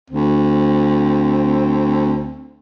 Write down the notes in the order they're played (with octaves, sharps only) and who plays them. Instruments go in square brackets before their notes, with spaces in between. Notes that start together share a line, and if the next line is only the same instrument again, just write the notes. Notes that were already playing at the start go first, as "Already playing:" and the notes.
[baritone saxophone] D2 [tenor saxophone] C4